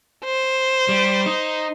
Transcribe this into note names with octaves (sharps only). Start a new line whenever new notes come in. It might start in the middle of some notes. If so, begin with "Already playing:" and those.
C5
G3
D#4